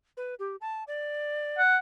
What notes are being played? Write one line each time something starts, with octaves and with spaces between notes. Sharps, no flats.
B4
G4
A5
D5
F#5